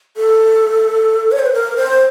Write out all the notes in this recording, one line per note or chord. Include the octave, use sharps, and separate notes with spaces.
A4
C#5
C5
B4
A#4
C5